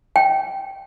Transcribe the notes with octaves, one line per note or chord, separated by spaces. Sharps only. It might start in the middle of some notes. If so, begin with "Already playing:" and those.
G5